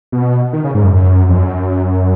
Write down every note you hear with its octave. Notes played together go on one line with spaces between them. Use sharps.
B2
D#3
C#3
G#2
F#2
F#2
F2
F#2